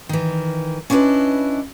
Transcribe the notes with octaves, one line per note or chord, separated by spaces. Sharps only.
D#3 E3
C#4 D4 E4 G4 B4 D#5